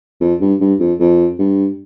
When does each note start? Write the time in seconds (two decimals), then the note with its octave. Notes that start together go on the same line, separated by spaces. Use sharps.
0.21 F2
0.40 G2
0.60 G2
0.80 F2
0.99 F2
1.39 G2